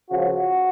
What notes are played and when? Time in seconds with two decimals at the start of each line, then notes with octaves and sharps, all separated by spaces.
0.10 C#2 C#3 F3 F#4